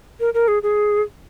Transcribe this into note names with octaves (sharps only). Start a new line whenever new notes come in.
A#4
A#4
G#4
G#4